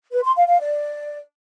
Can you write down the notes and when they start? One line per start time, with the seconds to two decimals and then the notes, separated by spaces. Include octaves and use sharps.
0.13 B4
0.24 C6
0.36 F5
0.48 F5
0.60 D5